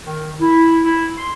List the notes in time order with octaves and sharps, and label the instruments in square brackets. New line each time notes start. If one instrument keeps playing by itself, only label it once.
[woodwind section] D#3
E4
E4
C6